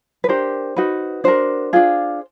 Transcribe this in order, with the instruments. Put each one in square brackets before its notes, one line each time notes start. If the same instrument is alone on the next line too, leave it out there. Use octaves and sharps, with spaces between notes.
[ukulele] B4
D4 G4 A#4 C5
D#4 F#4 B4
D4 F#4 A#4 C5
D4 F4 G#4